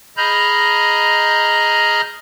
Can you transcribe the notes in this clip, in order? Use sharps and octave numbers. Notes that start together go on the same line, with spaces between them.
G#4 D#5 A#5 B5 F6 G6